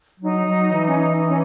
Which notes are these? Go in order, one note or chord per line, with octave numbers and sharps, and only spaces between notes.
F#3 D#4
F#3
E3
C#4
D#4
D#4
C#4